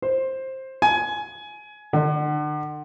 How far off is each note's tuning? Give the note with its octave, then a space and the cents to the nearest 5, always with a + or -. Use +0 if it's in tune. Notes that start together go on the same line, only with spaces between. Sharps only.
C5 +15
G#5 +20
D3 +35